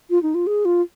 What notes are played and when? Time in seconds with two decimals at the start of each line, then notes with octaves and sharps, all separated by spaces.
0.10 F4
0.23 D#4
0.34 F4
0.47 G#4
0.65 F4